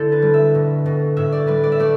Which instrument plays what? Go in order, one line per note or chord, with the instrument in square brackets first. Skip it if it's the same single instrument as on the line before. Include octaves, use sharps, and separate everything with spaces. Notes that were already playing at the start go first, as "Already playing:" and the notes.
Already playing: [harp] D3 A3 E4 G4 A4
B4
G3
E5
B2
B2
A2 E5
D5
G3 B4
D5
E5
A3 D5